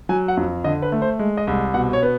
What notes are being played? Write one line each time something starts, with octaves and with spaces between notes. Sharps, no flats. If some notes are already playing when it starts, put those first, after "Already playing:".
F#3 G#5
F#5
F2
D3 D#5
B4
A3
C5
G#3
D#5
C2
B2 F#5
C#5
B3